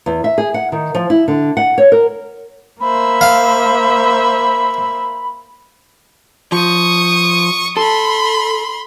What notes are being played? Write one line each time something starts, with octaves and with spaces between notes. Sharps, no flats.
E2
E5
G#4
F#5
D#3
F3
E4
D3
F#5
C#5
A#4
A#3 C5 E5 B5
F5
F3 C#6 D#6
A4 B5 C6